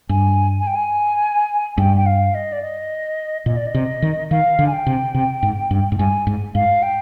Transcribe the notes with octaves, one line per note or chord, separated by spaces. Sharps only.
G2 G#5
G#5
G5
G#5
G2 G5
G5
F5
D#5
D5
D#5
A#2 D#5
D5
D#5
C3
D#3
D#3 F5
D3
G#5
G5
C3
C3
G#2
G2
G#2
G2 G#5
G#2
G#2 F5
G5